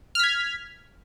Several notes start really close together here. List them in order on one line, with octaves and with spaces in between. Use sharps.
F6 B6 G#6